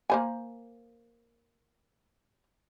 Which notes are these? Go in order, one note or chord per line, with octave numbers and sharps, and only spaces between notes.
A#3 C5 G#5